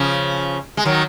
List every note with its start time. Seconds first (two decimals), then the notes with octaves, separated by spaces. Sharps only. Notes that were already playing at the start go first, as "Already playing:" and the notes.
Already playing: C#3 F3
0.77 G#3
0.85 D#3 F#3